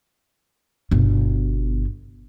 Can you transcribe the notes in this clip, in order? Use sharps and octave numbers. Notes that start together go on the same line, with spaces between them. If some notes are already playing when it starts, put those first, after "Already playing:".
G1 B2